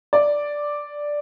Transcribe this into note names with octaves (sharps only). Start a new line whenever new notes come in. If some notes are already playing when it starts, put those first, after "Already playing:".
D5